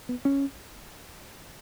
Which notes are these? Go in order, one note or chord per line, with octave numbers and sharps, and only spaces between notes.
B3
C#4